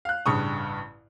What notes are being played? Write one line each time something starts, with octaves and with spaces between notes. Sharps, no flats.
F5 F#6
A1 G2 C#3 C#6 D#6